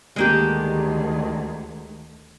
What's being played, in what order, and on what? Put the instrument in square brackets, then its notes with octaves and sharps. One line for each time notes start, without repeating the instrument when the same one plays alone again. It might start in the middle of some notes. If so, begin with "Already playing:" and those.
[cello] D2 D#3 [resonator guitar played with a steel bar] G#3 A#3 G4